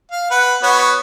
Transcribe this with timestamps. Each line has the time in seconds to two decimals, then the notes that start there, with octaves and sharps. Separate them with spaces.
0.11 F5
0.31 B4 F#5
0.63 B3 F#4 C#5